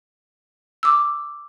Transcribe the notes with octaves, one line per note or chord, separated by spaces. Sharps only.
D6 E6